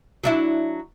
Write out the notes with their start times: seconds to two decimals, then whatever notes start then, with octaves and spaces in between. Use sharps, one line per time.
0.24 F#3 D4 E4